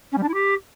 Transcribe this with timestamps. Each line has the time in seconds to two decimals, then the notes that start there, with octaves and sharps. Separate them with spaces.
0.11 C#4
0.17 G3
0.22 D4
0.28 E4
0.33 G4